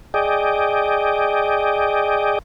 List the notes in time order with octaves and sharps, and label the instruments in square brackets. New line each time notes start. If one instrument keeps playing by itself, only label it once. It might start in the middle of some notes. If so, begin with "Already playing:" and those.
[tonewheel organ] G#4 D5 D#5 G5